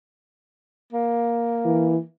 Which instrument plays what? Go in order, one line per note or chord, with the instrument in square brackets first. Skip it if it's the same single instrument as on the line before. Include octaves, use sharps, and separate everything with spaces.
[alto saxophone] A#3
[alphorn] E3